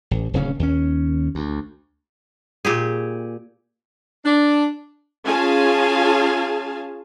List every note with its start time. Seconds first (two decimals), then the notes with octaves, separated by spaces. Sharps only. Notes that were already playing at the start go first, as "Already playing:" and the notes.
0.11 A1
0.34 D1 C#3 C#4
0.59 D#2 C#4
1.35 D2
2.65 A#2 G4 G#4
4.24 D4
5.25 C#4 F4 G#4 F5 G#5 A5